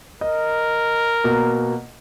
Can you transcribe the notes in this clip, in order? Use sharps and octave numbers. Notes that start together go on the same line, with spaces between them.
A#4 D#5
B2 A#3